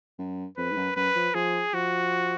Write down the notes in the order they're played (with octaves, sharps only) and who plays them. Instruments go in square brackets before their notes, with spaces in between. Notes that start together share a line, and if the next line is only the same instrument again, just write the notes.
[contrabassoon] F#2
[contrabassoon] F2 [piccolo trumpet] B4
[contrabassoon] G#2
F#2
[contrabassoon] F#2 [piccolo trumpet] B4
[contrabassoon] F3
[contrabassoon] F3 [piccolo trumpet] G#4
[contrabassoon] F3 [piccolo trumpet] F#4